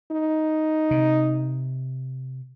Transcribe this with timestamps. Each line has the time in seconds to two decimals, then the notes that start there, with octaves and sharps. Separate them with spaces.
0.12 D#4
0.91 C3